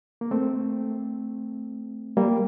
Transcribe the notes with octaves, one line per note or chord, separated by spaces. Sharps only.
A#3
A3 C4
G3 A#3